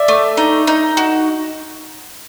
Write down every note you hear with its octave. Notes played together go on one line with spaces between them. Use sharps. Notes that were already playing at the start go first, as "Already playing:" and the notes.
Already playing: D5 E5
A3
D#4
D#4
F#4